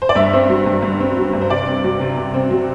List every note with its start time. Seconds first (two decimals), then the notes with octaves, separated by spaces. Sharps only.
0.02 C5
0.09 D5
0.15 G2 E5
0.33 C4
0.49 F#3
0.66 G2
0.83 G2
1.01 C4
1.17 F#3
1.33 G2
1.41 C5
1.50 C3 D5
1.67 C4
1.84 F#3
2.00 C3
2.17 C3
2.34 C4
2.51 F#3